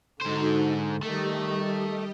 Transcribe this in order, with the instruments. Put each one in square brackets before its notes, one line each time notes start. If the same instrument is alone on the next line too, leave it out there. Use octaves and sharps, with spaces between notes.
[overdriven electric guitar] G#2 C5 [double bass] D3 [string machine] D#4 F#4 A4
[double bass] D#3 [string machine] G3 G4 D#5 [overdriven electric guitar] A3